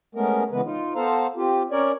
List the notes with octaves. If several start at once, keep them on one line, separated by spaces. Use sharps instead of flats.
G#3 A3 B3 C#4 A#4
C#3 E3 G#3 B3 B4
D#4 F4
B3 A4 C5 F5 A#5
C4 F4 G4
C#4 A#4 C#5 D5